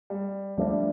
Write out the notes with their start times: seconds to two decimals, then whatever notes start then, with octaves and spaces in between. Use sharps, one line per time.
0.10 G3
0.57 F3 G3 A3 D4